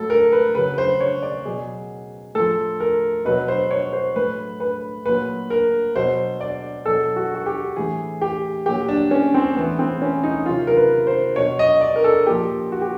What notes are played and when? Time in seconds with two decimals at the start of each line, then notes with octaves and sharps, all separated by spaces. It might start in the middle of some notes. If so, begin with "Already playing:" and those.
Already playing: A2 F#3 A4
0.10 A#4
0.32 B4
0.55 C#3 F#3 B4
0.78 C5
1.01 C#5
1.22 D5
1.45 B2 F#3 G#4
2.35 A2 F3 A4
2.80 A#4
3.25 B2 F#3 B4
3.48 C5
3.71 C#5
3.93 C5
4.16 A2 F#3 B4
4.60 B4
5.06 A#2 F#3 B4
5.50 A#4
5.96 B2 F#3 C5
6.41 D5
6.86 B2 F#3 A4
7.16 F#4
7.35 F#4
7.46 G4
7.76 A2 E3 G#4
8.21 G4
8.66 A#2 F#3 G4
8.88 D4
9.11 C#4
9.34 C4
9.56 A2 E3 B3
9.79 C4
10.02 C#4
10.24 D#4
10.46 C3 D#3 F#3 F4
10.67 A#4
10.77 B4
11.07 C5
11.36 B2 F#3 C#5
11.59 D#5
11.81 D5
11.96 A#4
12.04 A4
12.27 A#2 F3 G4
12.72 F#4
12.81 G4